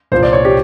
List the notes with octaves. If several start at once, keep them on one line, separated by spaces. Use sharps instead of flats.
C2 A#2 F3 C5
D5
C#5
G4